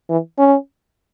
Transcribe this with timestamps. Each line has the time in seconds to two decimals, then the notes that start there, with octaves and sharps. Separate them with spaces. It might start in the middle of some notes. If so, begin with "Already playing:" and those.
0.10 E3
0.38 C#4